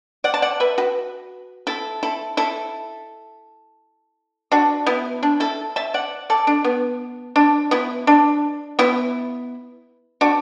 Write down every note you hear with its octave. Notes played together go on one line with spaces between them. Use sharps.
D5 F#5
A5
D5 F#5
B4 E5
F#4 B4
E4 A4
E4 A4
E4 A4
D4 F#4
B3 E4
D4
E4 A4
E5 A5
D5 F#5
A4 D5
D4
B3
D4
B3 E4
D4
B3 E4
D4 F#4